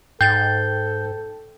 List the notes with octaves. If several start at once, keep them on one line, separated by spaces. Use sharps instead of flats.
G#2 A4 G5 G6 A6